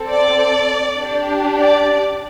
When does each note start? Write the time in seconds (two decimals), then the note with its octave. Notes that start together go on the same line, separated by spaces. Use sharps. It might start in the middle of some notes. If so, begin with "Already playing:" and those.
Already playing: C4 A4
0.09 D5
0.98 D4 G4
1.57 D5